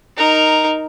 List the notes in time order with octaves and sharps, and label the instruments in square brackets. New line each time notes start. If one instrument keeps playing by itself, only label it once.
[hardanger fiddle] D#4 A#4